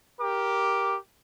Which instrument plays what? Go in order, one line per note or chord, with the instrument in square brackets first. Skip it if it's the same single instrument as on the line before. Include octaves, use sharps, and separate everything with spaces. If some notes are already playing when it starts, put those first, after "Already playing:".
[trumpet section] G4 A#4 D6